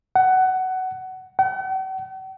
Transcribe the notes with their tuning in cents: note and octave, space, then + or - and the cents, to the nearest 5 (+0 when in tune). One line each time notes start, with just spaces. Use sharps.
F#5 +15
F#5 +45